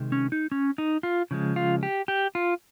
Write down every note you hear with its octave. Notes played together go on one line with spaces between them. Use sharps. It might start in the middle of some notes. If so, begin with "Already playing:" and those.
Already playing: C3 D#3 G#3
C#4
D#4
C#4
D#4
F4
C#3 F3 G#3
F4
G4
G4
F4